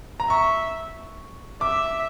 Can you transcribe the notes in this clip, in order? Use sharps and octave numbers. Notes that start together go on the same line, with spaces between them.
A#5
E5 C#6
E5 D6